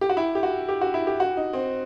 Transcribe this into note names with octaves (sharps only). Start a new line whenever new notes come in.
G4
F#4
E4
G4
F#4
G4
F#4
E4
G4
F#4
D#4
C4